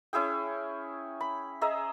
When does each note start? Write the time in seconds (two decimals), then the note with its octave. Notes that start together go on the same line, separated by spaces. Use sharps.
0.13 C#4 E4 G#4 G5
1.21 B5
1.61 G#4 D#5 E5 A#5